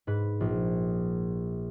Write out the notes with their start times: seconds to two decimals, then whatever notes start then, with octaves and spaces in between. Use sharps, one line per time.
0.07 G#2 B4
0.40 A#1